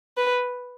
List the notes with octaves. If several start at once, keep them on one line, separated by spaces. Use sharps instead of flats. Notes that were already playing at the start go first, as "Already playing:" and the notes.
B4